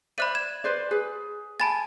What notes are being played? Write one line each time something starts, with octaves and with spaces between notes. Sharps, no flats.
C5 D5 E5 B5 F#6 D#7
G#6 E7
B4 C5 D5
G#4 B4
G#5 A5 B5 A6